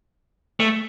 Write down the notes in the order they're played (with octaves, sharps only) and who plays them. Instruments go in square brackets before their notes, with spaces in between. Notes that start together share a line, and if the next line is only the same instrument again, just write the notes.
[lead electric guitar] A3